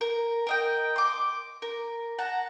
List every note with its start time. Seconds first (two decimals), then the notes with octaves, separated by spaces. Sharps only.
0.01 A#4
0.47 A#4 D#5 G5
0.96 C6 D6
1.62 A#4
2.19 F#5 A5 A#5